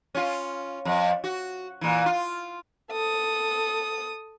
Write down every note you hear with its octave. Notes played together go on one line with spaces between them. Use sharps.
C#4 F4
F2
F#4
A#2 E3
F4
A4 D#6